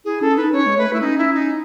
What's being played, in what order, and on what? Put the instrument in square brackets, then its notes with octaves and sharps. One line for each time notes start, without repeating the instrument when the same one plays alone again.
[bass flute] E4 [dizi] G#4
[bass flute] C#4 [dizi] A4
[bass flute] D#4 [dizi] B4
[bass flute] C#4 [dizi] C#5
[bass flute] G#3
[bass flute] A3 [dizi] B4
[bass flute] A3 [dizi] E4
[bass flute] C#4 [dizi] D#4
[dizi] E4
D#4